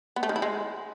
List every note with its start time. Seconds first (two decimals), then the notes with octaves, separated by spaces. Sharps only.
0.16 B3
0.23 A3
0.29 D#3
0.36 E4
0.42 G#3